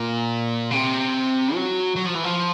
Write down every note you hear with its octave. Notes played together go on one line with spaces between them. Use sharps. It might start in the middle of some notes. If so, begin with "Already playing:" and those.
Already playing: A#2
C#3
C3
F#3
F#3
F3
E3
F3